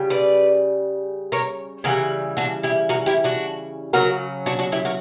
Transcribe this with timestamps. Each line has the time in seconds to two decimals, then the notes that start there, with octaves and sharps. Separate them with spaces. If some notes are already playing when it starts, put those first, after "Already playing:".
Already playing: C#3 G3
0.10 B4 D5
1.32 A#4 C#5
1.84 C#3 E3 G3 F#4 A#4
2.37 D4 F#4
2.63 E4 G4
2.89 F#4 A#4
3.06 E4 G4
3.24 D4 F#4
3.93 C#3 F#3 F#4 A#4
4.46 D4 F#4
4.59 D4 F#4
4.72 E4 G4
4.85 F#4 A#4